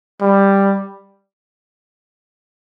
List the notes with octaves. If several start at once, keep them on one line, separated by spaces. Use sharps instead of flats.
G3